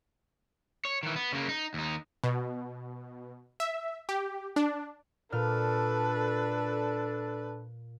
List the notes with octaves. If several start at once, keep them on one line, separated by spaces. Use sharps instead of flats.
C#5
D#3 E3
B3
C#3 A#3
D#4
D#2 D#4
B2
E5
G4
D4
A#2 D4 A4 B4 F6